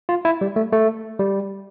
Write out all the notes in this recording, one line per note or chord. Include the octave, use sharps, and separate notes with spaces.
F4
E4
G3
A3
A3
G3